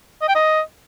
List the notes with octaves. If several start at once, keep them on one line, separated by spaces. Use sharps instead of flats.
D#5
G5
D#5